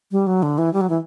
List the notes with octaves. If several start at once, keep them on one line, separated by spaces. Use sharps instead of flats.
G3
F#3
D3
E3
G3
F#3
E3